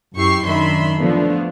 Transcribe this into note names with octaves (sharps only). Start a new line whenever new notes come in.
F#2 E4 G4 C#6 C7
F#2 D#3 D4 E5 B5 C6
D3 F3 A3 B3 D4 F4